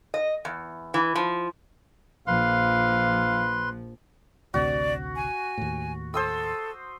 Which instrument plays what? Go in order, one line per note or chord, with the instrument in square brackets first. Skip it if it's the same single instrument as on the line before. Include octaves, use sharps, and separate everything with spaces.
[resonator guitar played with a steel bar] D#5
E2
E3
F3
[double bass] A#1 F3 [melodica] B4 C6 [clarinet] F5
[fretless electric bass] A1 D2 C3 [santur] F#4 [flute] D5
[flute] G#5
[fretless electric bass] D#2 A2
[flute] A4 [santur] C5 D#6 E6